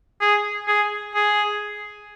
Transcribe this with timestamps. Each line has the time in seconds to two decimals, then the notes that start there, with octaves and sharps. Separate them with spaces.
0.21 G#4
0.68 G#4
1.15 G#4